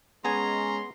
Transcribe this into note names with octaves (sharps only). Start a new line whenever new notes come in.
G#3 B3 C#4 G#4 G#5 A#5 C6